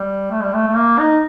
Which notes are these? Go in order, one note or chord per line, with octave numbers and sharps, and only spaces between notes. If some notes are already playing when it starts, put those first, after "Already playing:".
Already playing: G3
A3
G3
A3
A3
A#3
D#4